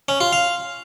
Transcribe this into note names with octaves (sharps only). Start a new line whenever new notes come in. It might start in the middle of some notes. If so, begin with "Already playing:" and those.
C#4
F4
F5